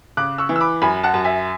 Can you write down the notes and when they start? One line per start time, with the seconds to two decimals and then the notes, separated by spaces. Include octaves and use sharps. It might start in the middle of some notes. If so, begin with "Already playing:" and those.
0.17 C#3 D6 F#6
0.38 C#6 E6
0.49 E3
0.56 E6
0.61 B5 D6
0.82 F#2 G#5 B5
1.03 F#5 A5
1.14 F#2
1.24 E5 G#5